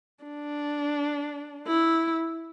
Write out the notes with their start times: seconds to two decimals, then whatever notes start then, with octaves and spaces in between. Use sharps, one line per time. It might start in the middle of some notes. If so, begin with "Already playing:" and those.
0.24 D4
1.67 E4